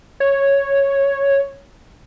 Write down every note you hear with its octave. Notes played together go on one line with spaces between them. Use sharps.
C#5